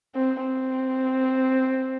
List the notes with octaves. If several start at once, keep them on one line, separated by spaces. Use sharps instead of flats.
C4
C4